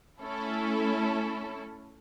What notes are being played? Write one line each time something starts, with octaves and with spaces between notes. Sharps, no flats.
A3 C#4 E4 A4